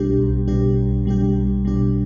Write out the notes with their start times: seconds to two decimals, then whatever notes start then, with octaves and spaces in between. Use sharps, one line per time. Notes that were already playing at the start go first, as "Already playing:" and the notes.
Already playing: B1 B2 G3 D4 G4
0.19 B1
0.47 B2 G3 D4 G4
0.77 B1
1.06 B2 G3 D4 G4
1.35 B1
1.65 B2 G3 D4 G4